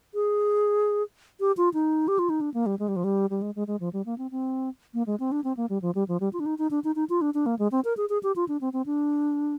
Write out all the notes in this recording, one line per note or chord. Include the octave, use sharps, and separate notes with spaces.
G#4
G4
F4
D#4
G4
F4
D#4
D4
A#3
G3
G#3
G3
F3
G3
G3
G#3
G#3
G#3
F3
G3
A#3
C4
C4
A#3
G#3
C4
D4
C4
A#3
G3
F3
G3
F3
G3
F4
D4
D#4
D#4
D4
D#4
D#4
F4
D4
D4
A#3
G#3
C4
A#4
G#4
G#4
G4
F4
D4
C4
C4
D4